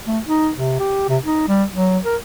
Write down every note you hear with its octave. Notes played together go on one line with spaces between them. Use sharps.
A3
D#4
C3
G4
C3
D#4
G3
F#3
A#4